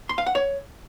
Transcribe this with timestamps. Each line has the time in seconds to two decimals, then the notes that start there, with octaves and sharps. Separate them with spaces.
0.09 C6
0.18 F5
0.26 F#5
0.35 C#5